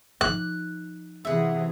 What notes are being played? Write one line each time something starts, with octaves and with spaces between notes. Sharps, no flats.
F3 D#4 F#6
C3 E3 G#4 E5 F#5